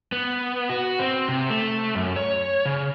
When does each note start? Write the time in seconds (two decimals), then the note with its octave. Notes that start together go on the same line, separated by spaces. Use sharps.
0.12 B3
0.69 F#4
0.99 C4
1.29 C3
1.50 A3
1.95 F#2
2.16 C#5
2.65 C#3